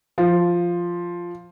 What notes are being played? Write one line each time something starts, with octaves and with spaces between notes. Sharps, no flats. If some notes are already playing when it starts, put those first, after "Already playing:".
F3